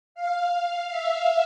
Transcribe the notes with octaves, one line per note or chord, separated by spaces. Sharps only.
F5
E5